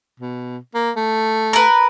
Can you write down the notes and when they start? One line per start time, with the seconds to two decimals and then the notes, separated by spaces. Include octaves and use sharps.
0.20 B2
0.75 A#3
0.96 A3
1.53 A#4 B4